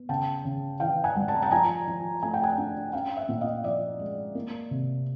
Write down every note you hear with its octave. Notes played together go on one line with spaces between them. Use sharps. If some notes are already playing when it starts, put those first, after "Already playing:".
Already playing: B3
C#3 G5 A5
C#3
E3 F5 G5
F#5 G#5
G3
A5
A#5
G5 A5
F3 G#5 A#5
F3
A3 G#5
G5
F#5 G#5
D4
C#4 F5 G5
E5 F#5
A#2
D#5 F5
F3 D5 E5
G#3
A#3
C3